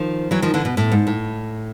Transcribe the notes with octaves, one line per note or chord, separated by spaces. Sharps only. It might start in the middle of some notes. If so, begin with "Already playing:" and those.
Already playing: D#3 F3
E3 F#3
D#3 F3
D3 E3
B2
A2
G#2
A2